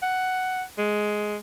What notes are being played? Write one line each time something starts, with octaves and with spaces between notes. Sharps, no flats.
F#5
G#3